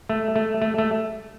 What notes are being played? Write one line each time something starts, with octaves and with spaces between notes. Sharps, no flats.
A3
A3
A3
A3